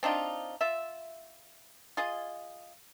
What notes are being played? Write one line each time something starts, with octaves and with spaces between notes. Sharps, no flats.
C4 D4 D#4 F4
F4 E5
F4 G#4 D#5